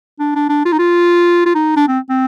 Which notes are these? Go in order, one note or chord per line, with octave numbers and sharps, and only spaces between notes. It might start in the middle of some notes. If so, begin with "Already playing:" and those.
D4
D4
D4
F4
D#4
F4
F4
D#4
D4
C4
C4